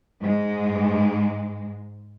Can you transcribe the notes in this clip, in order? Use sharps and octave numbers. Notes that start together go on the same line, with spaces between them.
G#2 G#3